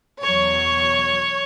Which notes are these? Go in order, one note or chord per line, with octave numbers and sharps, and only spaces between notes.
E2 B2 F#3 C#5